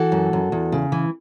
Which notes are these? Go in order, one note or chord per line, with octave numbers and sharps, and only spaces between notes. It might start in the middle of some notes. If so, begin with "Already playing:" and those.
Already playing: E3 F#4 A4
F#2
F#2
E2
C#3
E3